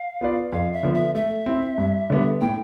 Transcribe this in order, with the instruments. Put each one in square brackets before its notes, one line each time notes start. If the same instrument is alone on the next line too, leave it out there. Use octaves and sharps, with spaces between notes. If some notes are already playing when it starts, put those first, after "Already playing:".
Already playing: [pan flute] F5
[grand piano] B3 F4 B4 D5
[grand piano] F2 [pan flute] F5
[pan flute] E5
[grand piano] D3 F3 B3
[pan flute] E5
[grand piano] A3 [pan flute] E5
[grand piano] C4 E4
G2
D3 G3 B3 D4
[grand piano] A2 [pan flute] G5